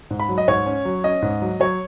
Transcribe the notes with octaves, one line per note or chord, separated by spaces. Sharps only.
G#2
B5
F#3
D#5
G#2 C#5
C#4
F#3
C#4 D#5
G#2
F#3
F#3 C#5